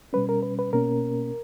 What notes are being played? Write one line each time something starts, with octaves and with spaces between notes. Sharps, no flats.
B2 G3 C#4 B4
A#4
B4
B4
B2 A#3 C#4 A#4